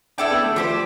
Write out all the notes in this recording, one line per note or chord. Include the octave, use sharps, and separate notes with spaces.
D4 E4 A4 D5 G5
B3
A3
F3 D4 G4 C5